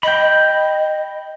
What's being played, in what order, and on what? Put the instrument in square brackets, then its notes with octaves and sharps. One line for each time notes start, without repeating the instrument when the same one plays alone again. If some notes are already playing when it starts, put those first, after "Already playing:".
[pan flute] D#5 [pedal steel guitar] G5 B5